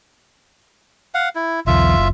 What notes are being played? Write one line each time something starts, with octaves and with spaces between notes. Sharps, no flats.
F5 F#5
E4
B1 E2 F4 E5
F#1